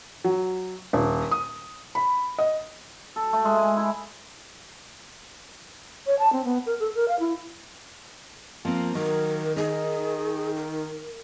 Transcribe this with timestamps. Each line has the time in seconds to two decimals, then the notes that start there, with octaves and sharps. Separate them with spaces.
0.24 F#3
0.93 D#1
1.31 D#6
1.95 B5
2.38 D#5
3.16 A4
3.33 A3
3.45 G#3
3.58 G#5
3.77 E4
6.06 C#5
6.19 A5
6.33 C4
6.44 B3
6.66 A#4
6.80 A4
6.95 A#4
7.08 F5
7.19 E4
8.65 F3 A#3 C4
8.95 D#3 F#3 A#4
9.56 D#4 G#4
10.55 A#4